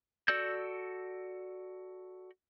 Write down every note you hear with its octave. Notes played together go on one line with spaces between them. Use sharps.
F#4 A4 D5 E6 G6